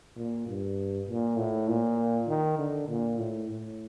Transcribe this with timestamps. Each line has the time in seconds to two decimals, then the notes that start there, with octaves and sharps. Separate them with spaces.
0.16 A#2
0.47 G2
1.08 A#2
1.37 A2
1.68 A#2
2.27 D#3
2.58 D3
2.88 A#2
3.18 A2
3.49 A2